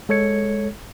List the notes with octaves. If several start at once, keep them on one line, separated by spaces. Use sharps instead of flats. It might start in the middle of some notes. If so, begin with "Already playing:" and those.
G#3 A4 C#5 G#6 C#7